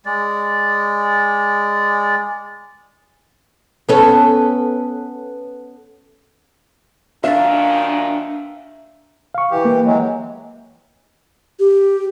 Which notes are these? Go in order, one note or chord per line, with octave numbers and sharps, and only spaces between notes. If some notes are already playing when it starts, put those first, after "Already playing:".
G#3 D5
B3 C#4 A4
F#2 A#2 D#3 D4 E5 F5 C#6 A6
F5 C#6
E3 G4
A#3
E3 F#3 G#3
G4